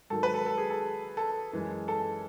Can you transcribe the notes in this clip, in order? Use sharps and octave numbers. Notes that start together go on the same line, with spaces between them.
G#2 D#3 F#3 A4
B4
A4
A4
G#4
A4
A4
F#2 E3 G#3
A4